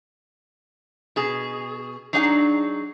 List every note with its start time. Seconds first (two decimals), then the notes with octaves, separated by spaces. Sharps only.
1.16 B2 G#4
2.13 F#3 D4 D#4 G#4 F#5